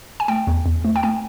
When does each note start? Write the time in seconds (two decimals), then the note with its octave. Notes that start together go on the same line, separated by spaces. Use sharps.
0.20 G#5
0.28 A3 G5
0.47 E2
0.66 E2
0.85 A3
0.96 G5
1.03 A3 G#5